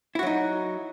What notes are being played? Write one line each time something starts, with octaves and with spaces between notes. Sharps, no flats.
F#3 D#4 E4 F#4